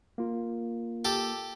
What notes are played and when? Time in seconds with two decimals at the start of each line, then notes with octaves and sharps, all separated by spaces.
0.18 A#3 F4
1.05 G4 A4